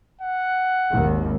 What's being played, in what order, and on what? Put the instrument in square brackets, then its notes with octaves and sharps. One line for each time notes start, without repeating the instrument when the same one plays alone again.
[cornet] F#5
[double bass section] G#1 D#2